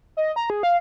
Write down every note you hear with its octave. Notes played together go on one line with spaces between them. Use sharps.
D#5
A#5
G#4
F5